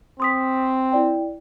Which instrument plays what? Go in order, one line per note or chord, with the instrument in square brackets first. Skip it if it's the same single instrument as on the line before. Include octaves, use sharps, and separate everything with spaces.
[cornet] C4 [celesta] C6 D#6 B6
[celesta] E4 D5 G5